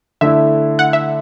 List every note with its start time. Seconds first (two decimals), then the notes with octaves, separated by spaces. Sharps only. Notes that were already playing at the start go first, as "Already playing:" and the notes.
0.21 D3 A3 E4 E5
0.79 F#5
0.93 E5